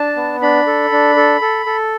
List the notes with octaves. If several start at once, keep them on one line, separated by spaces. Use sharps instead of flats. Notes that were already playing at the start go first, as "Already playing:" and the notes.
Already playing: D4 A5
B3
D4 B5
A4
D4
A4
A4
A4